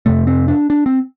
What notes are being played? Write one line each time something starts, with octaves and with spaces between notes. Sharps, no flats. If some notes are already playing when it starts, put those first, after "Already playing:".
F2 C3 A3
C4
D4
D4
C4